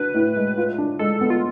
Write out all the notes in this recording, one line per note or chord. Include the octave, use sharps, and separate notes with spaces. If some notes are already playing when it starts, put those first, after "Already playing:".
Already playing: D4 F#4 B4
A2
G#3
F4
D4
G#3 A4
B3
F4